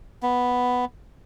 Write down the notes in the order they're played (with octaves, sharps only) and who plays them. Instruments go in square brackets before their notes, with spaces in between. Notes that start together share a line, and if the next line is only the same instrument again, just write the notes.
[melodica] B3